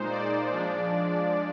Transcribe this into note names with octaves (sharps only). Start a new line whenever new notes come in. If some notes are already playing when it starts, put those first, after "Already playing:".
Already playing: A#2 G#3 D#4 C5
D5
F3 G#3 D4